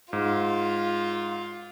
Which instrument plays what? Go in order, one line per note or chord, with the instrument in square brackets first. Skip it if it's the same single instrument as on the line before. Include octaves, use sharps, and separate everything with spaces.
[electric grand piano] G#2 [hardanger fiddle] F4